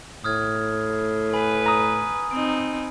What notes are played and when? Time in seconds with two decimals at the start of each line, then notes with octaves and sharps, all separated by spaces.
0.24 A2 D#6 F6 G#6
1.33 B4 G#5 B5 F#7
1.66 A#5 D#6
2.31 C4 D#4 D7